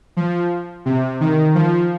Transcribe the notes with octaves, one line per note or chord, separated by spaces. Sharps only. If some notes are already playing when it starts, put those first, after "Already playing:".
F3
C3
D#3
F3